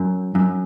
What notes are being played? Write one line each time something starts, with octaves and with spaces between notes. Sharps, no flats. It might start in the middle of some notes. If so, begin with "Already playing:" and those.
Already playing: F#2
F#2